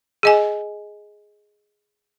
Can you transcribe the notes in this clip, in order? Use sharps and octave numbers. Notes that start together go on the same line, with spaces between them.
G#4 D#5 G#5